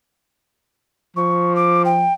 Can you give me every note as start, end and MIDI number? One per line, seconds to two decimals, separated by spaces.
1.16 2.11 53
1.16 1.53 85
1.56 1.83 86
1.85 2.13 79